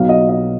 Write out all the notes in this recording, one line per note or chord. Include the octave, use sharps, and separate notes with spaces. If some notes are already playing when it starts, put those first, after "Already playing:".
Already playing: B1 B2 F#3 F5
D#5
D#5